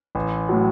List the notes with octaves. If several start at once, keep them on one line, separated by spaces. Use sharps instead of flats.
A1
A2 F#3